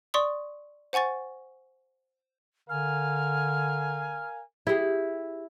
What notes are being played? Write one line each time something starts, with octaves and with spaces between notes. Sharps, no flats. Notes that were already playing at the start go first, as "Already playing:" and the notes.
D5 C6 C#6 D#6
C5 F#5 G#5 C#6 A6
D3 A#4 F5 G#5 F6
E4 G4 G#4